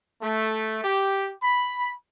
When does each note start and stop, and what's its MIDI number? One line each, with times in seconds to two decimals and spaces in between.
0.22 0.81 57
0.83 1.33 67
1.41 1.93 83